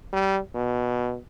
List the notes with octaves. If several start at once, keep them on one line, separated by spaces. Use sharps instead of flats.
G3
B2